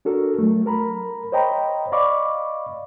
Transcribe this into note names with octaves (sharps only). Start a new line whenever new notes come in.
D4 F#4 A4 A#4
F#3 A3
A#4 A#5 B5
C5 C#5 D#5 G5 A#5 B5
D5 D#5 F5 B5 C#6 D6